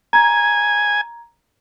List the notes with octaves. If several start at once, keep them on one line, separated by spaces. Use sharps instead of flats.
G#5 A#5 G#6